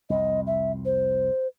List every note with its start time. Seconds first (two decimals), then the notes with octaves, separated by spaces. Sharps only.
0.10 C2 F2 D#5
0.47 E5
0.85 C5